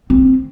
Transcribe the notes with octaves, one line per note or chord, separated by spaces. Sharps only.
C4